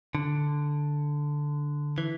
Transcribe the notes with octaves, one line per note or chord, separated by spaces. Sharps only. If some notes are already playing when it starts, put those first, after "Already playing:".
D3
E3